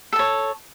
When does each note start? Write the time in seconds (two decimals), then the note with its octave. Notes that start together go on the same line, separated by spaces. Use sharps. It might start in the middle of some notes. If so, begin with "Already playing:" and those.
0.13 A4
0.16 A5
0.19 C#5